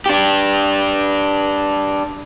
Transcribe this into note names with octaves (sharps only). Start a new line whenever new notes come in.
D4 G4